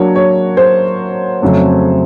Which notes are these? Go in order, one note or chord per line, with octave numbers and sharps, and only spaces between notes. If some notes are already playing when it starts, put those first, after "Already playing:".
Already playing: F#3 A#3 D4 F#4 A#4 C#5
C#5
C5
F2 C#3 F#3 A3